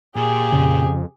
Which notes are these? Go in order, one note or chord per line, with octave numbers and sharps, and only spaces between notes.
A#2 G4 G#4
F2 C#3